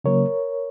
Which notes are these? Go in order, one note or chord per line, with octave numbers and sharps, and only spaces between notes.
C#3 F#3 A#3 A#4 C#5